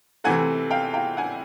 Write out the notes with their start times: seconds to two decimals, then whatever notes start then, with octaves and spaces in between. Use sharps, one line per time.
0.24 C3 E3 A3 F#5 G#5
0.70 F5 G5
0.94 F5 G5
1.17 F#5 G#5